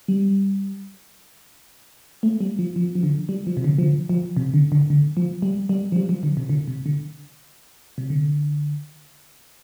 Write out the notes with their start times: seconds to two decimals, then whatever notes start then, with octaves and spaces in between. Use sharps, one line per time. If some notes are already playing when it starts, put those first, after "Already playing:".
0.08 G3
2.23 A3
2.41 G3
2.59 F3
2.76 F3
2.95 F3
3.03 D3
3.29 G3
3.47 F3
3.57 C3
3.64 D3
3.78 F3
3.83 D3
4.09 F3
4.37 C3
4.54 D3
4.72 D3
4.90 D3
5.17 F3
5.42 G3
5.69 G3
5.92 F3
5.96 G3
6.09 F3
6.23 D3
6.37 C3
6.49 D3
6.68 C3
6.86 D3
7.98 C3
8.10 D3